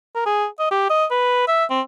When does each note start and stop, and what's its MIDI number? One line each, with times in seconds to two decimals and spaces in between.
0.15 0.23 70
0.26 0.46 68
0.59 0.69 75
0.71 0.84 67
0.90 1.05 75
1.11 1.44 71
1.48 1.65 76
1.70 1.81 60